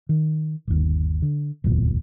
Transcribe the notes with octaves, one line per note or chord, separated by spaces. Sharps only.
D#3
G1 D#2
D3
D1 G1 E2 A#2